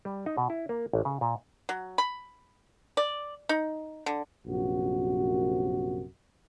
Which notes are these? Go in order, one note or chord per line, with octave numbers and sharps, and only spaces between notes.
G3
D#4
B2
E4
A#3
A1
C#3
A#2
F#3
B5
D5
D#4
D3
A#1 F#2 C3 F#4